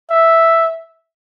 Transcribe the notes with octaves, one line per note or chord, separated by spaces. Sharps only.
E5